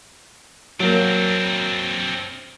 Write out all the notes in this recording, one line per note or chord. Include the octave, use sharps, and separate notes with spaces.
F#3 A#3 C4 D4